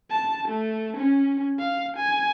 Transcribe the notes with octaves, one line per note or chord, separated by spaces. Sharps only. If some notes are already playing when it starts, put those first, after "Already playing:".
A5
A3
C#4
F5
G#5